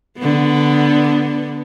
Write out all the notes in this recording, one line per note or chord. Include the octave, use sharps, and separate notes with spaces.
D3 B3